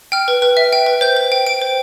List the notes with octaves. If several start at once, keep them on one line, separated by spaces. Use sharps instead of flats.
G5 F6
B4
B4
E5
G5
B4
C5 G6
C5
G5
G5 D7
C5